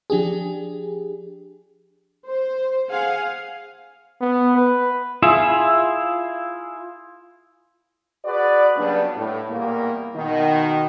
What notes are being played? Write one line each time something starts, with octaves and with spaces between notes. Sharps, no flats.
F3 D4 G4 G#4
C5
G#4 F5 F#5 G#5
B3
B4
E4 F4 G#4 E5
F#4 G#4 B4 D5
C#3 F#3 G3 A#3 B3 D4
A2
E2 A#2 G3 A#3
B2 D#3